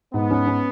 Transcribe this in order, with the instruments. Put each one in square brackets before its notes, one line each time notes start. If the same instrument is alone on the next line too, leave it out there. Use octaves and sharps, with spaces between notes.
[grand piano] G#2 [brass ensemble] B3
[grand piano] C#4
C#4